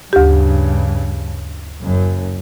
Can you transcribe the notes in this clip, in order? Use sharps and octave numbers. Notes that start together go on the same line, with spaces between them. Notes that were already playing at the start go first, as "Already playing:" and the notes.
D2 G2 C#3 G4
F#1 F#2